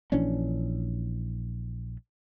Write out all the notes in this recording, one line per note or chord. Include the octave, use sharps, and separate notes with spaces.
A#1 E3 C#4 D4